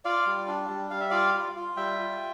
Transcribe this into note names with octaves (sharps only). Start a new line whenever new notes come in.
F4 D5 F5
G3
D4
G3
G3 F5
E5
F4 D5 F5
F4
F4
G3 E5 G5
F4